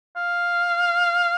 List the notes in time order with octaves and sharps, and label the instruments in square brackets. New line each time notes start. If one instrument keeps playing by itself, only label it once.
[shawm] F5